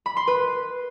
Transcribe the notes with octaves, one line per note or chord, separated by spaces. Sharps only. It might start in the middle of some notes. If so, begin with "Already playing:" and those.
B5
C6
B4